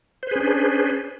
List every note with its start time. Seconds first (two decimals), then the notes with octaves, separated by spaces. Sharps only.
0.23 C5
0.27 B4
0.31 G#4
0.36 C#4
0.40 D4